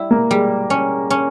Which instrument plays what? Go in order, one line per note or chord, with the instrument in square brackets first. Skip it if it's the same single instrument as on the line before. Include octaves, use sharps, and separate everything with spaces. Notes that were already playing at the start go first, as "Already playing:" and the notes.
Already playing: [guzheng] G3 E4
[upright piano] A#3
[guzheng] G3 [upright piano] G#3
[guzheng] C#4
C#4